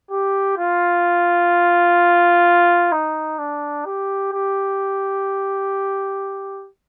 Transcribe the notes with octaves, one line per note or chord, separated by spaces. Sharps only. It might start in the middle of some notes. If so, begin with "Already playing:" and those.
G4
F4
D#4
D4
G4
G4